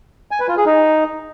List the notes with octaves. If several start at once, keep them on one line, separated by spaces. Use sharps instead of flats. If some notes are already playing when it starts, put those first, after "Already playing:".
G#5
B4
F4
G#4
D#4